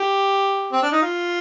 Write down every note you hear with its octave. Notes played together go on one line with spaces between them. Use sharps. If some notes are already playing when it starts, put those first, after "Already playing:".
Already playing: G4
C4
D4
D#4
F4